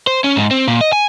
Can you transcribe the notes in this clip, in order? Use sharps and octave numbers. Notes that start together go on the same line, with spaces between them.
C5
C#4
G#2
C4
A#2
D#5
G#5